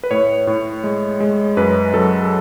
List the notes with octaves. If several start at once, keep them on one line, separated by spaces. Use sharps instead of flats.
B4
A2 C#5
A2
G#3
G#3
F#2 B4
F#3 A4